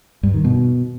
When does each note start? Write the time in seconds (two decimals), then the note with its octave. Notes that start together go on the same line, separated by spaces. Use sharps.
0.23 G2
0.34 D#3
0.44 B2